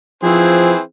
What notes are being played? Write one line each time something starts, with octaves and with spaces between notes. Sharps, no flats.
E3 F3 C4 G#4